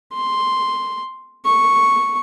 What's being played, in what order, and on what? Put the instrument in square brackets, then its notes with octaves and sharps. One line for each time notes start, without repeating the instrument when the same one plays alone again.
[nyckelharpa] C6
C#6